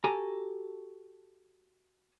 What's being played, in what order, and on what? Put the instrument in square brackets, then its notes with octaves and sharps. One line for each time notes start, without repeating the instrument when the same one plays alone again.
[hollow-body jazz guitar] F#4 G4 A4 G#5 A#5